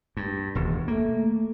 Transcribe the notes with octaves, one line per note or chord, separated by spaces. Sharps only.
G2
E1 D#2
A3 A#3